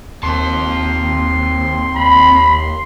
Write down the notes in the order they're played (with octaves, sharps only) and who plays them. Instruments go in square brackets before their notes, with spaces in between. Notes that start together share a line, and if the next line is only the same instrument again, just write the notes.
[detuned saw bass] D#2 [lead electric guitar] C4 A5 [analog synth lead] C6
[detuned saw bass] D#2 [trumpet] B5